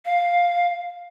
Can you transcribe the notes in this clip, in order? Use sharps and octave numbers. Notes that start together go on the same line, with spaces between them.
F5